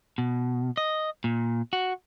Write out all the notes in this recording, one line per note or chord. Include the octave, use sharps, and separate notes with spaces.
B2
D#5
A#2
F#4